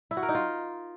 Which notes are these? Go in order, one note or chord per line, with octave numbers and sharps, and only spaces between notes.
E4
F#4
A#4
D#4
F4